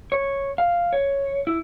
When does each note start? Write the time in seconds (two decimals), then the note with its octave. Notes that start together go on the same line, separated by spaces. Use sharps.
0.12 C#5
0.58 F5
0.93 C#5
1.47 E4